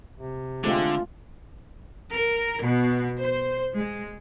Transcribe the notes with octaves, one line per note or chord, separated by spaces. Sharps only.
C3
D3 G#3 A3 C4 F4
A#4
B2
C5
G#3